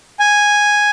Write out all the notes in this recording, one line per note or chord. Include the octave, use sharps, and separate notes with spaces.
G#5